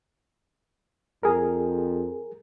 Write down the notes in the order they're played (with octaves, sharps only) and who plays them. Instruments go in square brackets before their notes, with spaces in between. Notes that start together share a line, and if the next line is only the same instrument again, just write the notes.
[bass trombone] F2 [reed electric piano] G#4 A#4